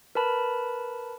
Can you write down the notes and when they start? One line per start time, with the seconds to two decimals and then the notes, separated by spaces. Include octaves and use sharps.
0.15 A#4 B4 A5 B5